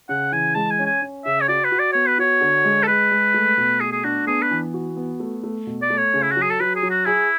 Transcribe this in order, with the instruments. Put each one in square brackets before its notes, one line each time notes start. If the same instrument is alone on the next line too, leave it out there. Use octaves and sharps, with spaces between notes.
[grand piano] C#3 [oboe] F#5
[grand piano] E3 [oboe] G#5
[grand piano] G#3 [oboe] A5
[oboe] G#5
[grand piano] C#4
[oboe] G#5
[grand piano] C#4
[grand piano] C#3 [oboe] E5
[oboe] C#5
[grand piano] F#4 [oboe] D5
[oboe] B4
[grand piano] F#4
[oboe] D5
[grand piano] B3 [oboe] C#5
[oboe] B4
[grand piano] F#4 [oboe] C#5
[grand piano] D3
G#3
[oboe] A4
[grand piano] G#3 [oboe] B4
[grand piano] G#3
A3
B2
[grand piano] A3 [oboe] G#4
[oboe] G#4
[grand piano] D4 [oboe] F#4
[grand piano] B3 [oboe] G#4
[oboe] B4
[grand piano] E3
F#4
B3
A3
A3
B2
[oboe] D5
[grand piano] A3
[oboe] C#5
[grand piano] C#3
[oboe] E4
F#4
[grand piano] F#3
[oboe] G#4
A4
[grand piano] F#3 [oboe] B4
[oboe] G#4
[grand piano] F#3
[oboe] F#4
[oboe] E4 [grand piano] G#4